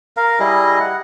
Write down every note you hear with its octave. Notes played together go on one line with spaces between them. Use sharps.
A#4 F5
G3 E4 G#4 D#5
F#5